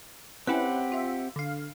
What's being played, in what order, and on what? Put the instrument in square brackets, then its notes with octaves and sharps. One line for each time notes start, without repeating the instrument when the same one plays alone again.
[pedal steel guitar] C4 G4 F#5 [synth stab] C#4 E4 B4
[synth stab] F4 E5
D3 F5